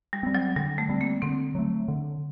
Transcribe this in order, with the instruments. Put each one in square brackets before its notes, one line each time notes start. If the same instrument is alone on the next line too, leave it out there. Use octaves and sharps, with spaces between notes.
[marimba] G3
[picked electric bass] G3 C4
[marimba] F#3
[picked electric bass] D3 [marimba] G3
[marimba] A3
[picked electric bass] G3 C4
[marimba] A#3
[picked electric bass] D3 [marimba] C4
[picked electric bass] F#3 A3
D3